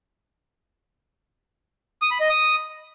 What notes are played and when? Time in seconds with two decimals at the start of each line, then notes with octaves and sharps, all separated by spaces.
2.02 D#6
2.11 B5
2.20 D#5
2.30 D#6